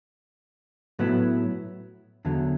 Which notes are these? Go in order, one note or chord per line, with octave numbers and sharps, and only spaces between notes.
A2 F#3 B3 E4
E2 D3 F#3